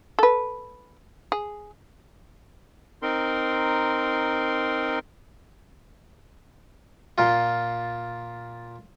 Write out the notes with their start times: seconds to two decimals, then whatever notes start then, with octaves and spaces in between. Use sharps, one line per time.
0.19 A4 B4
1.32 G#4
3.02 C4 D#4 A#4 C6
7.18 A#2 F4